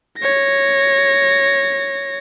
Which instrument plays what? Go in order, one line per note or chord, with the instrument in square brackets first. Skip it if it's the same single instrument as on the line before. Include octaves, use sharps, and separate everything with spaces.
[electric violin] C#5 A#6